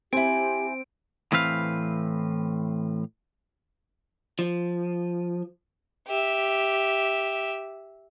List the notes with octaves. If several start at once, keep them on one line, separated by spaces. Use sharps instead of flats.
C4 E4 G4 G#5 D7
A2 E3 C4 B4 F5
F3
G4 E5